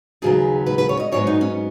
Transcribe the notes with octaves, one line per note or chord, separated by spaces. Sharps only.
D#2 C#3 F#3 B3 G#4
B4
B4
C#5
D#5
G#2 F#3 B3 C#5
D#4
C#4